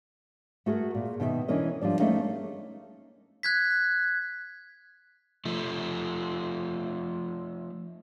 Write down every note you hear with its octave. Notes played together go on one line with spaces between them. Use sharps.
A3 F#4 G#4 A#4
A#2
B2 D#3 D5 E5
E3 C#4 D4 A#4 D#5
F3 G3 D4 D5
A3 A#3 C#4 D#4 G#4 F5
F#6 G#6 B6
F3 A3